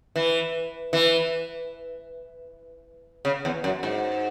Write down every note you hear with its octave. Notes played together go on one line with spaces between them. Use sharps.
E3
E3
C#3
E2
F#2
G#2